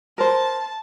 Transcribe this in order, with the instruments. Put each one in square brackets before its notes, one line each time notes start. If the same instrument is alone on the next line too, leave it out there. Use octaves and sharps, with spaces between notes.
[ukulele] A#4 C5 [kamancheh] A5